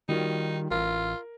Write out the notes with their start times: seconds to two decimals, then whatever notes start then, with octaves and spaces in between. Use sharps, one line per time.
0.09 D#3 G3 D#4 F4 F#4
0.71 A1 F4 A#4